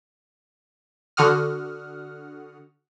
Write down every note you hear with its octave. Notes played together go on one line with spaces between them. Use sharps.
D3 F#4 F#5 D#6 F6